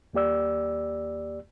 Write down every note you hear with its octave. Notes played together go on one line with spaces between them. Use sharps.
D#2 A#3 G4 D5 E6